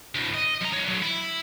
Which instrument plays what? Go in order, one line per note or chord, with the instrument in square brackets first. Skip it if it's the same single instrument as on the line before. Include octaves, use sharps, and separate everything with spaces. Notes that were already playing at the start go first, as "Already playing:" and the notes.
[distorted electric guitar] D2 A2
D#5
F#2 A#5
D#4 C#5
D3 F#3
E4